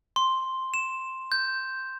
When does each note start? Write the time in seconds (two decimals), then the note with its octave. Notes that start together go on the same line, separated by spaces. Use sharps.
0.16 C6
0.74 E7
1.32 G6